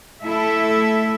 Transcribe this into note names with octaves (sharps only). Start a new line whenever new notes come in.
A3 E4 A4 E5